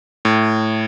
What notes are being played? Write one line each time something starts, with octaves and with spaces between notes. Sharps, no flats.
A2